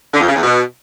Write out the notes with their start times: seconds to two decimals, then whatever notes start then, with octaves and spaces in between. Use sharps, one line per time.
0.13 D3
0.20 F2
0.28 C#3
0.35 E2
0.43 B2